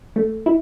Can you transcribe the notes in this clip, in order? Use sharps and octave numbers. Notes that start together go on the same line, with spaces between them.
A3
E4